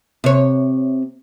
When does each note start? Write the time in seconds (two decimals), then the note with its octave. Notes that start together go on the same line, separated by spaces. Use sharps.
0.24 C3 C#5